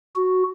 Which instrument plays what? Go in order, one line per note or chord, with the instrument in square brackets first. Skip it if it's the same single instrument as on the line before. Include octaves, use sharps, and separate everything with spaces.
[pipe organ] F#4